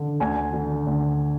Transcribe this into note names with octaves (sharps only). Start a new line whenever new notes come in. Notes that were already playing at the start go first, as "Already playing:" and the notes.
Already playing: D3
D2 G#5
D3
D2